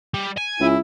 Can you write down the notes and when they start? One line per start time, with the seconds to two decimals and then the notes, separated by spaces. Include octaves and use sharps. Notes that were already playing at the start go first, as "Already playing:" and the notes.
0.14 G3
0.37 G#5
0.60 C#2 E4